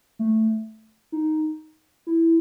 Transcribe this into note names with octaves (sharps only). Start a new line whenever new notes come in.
A3
D#4
E4